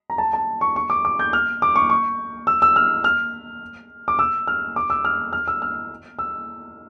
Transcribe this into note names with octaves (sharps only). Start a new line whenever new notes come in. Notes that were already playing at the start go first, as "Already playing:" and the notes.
A#5
A5
A5
C#6
C#6
D6
D6
G6
F6
D6
C#6
C#6
E6
E6
F6
F6
D6
E6
F6
D6
E6
F6
F6
E6
F6
E6